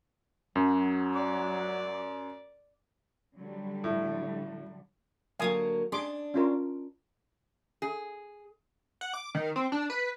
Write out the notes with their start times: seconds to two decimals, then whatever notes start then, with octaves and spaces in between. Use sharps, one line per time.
0.56 F#2 F#3
1.14 D5
3.38 D3 F#3 G3
3.84 A2
5.40 D3 F#3 A#3 F5 G#5 D#6
5.92 D4 G#4 C6 D6
6.34 C#4 F4 A#4
7.82 G#4
9.01 F#5
9.14 D6
9.35 D#3
9.56 C4
9.72 D4
9.90 B4